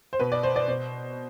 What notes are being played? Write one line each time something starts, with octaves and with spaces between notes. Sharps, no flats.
C5
B2 B4
D5
C5
D5
B2 C5